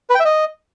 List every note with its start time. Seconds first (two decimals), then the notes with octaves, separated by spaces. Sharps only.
0.10 B4
0.15 G5
0.20 E5
0.25 D#5